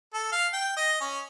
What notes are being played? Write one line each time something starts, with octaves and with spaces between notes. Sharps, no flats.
A4
F5
G5
D#5
C#4